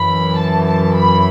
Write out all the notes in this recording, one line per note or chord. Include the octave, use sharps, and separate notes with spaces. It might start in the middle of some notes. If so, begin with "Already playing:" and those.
Already playing: F#2 E3 B5
A5
A5
B5